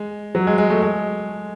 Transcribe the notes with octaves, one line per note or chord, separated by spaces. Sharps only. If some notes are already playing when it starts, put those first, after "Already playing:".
Already playing: G#3
F#3
G#3
G#3
A3
G#3